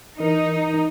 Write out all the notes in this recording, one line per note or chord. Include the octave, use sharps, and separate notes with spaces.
E3 D#4 A#4